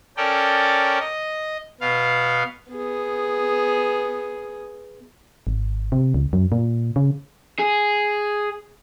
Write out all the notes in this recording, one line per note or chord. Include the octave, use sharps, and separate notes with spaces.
C#4 A4 A#4 D5 G5
D#5
B2 B3 F5
B3 G#4
G#1
C3
C#2
F#2
A#2
C#3
G#4